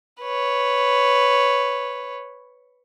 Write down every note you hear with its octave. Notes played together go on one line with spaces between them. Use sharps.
B4 C#5